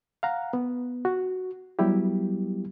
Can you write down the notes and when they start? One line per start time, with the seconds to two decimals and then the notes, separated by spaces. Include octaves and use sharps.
0.23 F5 F#5 A#5
0.53 B3
1.05 F#4
1.79 F#3 G3 B3 E4 G4